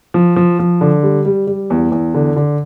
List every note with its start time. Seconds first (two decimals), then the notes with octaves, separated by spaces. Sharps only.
0.14 F3
0.36 F3
0.59 F3
0.81 D3
1.03 G3
1.25 G3
1.47 G3
1.70 E2
1.92 E2
2.14 D3
2.36 D3